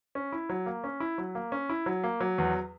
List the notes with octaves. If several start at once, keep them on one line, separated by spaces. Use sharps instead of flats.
C#4
E4
F#3
A#3
C#4
E4
F#3
A#3
C#4
E4
F#3
A#3
F#3
E2